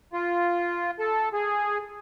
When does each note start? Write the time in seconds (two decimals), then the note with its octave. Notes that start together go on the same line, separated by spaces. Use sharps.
0.13 F4
0.99 A4
1.33 G#4